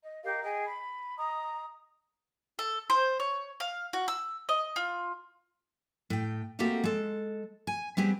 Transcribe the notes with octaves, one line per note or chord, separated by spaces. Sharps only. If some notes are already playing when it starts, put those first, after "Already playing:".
D#5
G4 A#4 D#5 F5
G#4 D#5 G5
B5
D#5 A#5 D#6
A4
C5
C#5
F5
F#4
E6
D#5
F4
A2 G5
A3 A#3 C4 F#4 G4 A4
G#3 A4
G#5
G3 B3 C4 G4 G#4